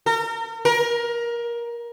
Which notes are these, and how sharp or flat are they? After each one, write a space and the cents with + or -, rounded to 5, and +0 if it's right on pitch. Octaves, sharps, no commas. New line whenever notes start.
A#4 -40
A#4 +20